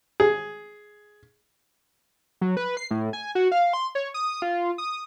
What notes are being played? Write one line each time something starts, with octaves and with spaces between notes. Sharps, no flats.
G#4
F#3
B4
C7
A2
G#5
F#4
F5
C6
C#5
D#6
F4
D#6